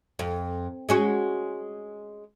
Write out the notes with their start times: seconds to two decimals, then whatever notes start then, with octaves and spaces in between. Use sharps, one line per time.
0.19 F2
0.89 G#3 C#4 F#4